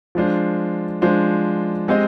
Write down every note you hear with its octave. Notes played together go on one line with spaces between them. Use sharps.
F3 G#3 D4 F4 C5
F3 G#3 D4 F4 C5
G#3 C4 G4 C5 D#5